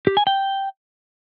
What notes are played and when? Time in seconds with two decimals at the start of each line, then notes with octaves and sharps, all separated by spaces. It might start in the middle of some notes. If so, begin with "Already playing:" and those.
0.07 G4
0.17 G#5
0.27 G5